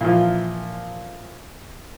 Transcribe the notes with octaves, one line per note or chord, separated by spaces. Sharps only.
A#2 E3 F3